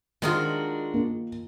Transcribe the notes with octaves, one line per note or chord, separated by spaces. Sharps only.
D#3 G#3 D4 D#4 F4 F#4
A#3